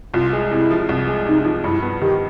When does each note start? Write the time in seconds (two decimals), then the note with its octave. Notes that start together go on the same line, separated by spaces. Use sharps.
0.14 C2 F4
0.33 G#3
0.51 C3 E4
0.70 F3
0.89 C2
1.08 G#3
1.26 C3 D#4
1.44 F3
1.63 G2 E4
1.82 B3
2.00 D#3 G4